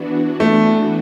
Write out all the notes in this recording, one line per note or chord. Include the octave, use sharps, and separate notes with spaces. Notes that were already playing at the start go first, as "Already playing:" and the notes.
Already playing: E3 B3 D4 F#4
A3